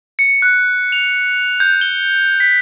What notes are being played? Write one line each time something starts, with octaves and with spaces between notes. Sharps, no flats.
C#7
F#6
F7
G6
G7
B6